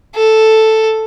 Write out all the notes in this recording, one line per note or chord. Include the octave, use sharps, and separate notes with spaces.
A4